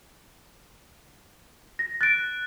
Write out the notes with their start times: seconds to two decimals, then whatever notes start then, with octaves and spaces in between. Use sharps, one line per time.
1.79 A#6
2.01 F#6 A6 D7